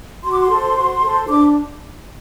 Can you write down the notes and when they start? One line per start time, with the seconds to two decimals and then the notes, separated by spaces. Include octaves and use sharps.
0.23 F#4 C6
0.32 D6
0.40 C6
0.50 A4 C5
0.76 F#4
1.02 A4 C5
1.28 D4 D6